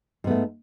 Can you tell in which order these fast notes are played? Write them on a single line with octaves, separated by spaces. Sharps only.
G#2 B3 A3